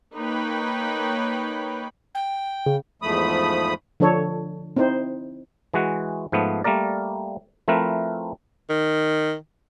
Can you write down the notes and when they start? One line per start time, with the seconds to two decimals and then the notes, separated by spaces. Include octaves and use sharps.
0.15 A#3 D#4 B4 C#5 G5 B5
2.14 G5
2.66 C#3
3.02 E2 G#2 F3 A3 B5 D#6
4.00 D3 F3 D4 A4 C#5
4.76 C4 D#4 E4 C5
5.74 E3 G#3 F#4 F#5
6.32 G#2 F3 A3 B3
6.64 G3 A3 A#3 A#4 D5
7.68 F3 A3 C4 E4 A#4 B4
8.69 D#3